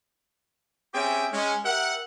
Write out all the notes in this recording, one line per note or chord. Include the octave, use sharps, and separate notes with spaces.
C4 C#4 G4 G#4 E5 G5
G#3 C#4
G4 A#4 E5 F#5